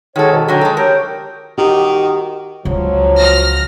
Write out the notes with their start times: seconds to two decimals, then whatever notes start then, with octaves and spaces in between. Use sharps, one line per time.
0.16 D#3 G#3 F#4 A4 C#5
0.32 G#2 B2
0.48 D3 F#3 C#5 G5 A#5
0.61 G#3 A4
0.77 G4 A#4 C#5 G5
1.58 D#3 F#4 G4
2.65 C#2 F3 F#3
3.15 F6 A#6